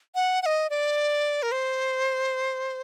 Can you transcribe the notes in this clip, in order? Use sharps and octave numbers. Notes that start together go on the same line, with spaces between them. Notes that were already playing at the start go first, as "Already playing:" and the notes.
F#5
F#5
D#5
D5
A#4
C5